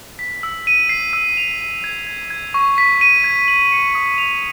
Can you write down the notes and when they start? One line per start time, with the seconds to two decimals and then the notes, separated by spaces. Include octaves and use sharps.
0.19 B6
0.43 E6
0.67 D#7
0.89 C7
1.13 E6
1.37 F7
1.60 D#7
1.84 G#6
2.07 G#6
2.30 G#6
2.54 C#6
2.78 B6
3.01 D#7
3.24 G#6
3.48 F#7
3.72 C#7
3.95 D#6
4.18 F7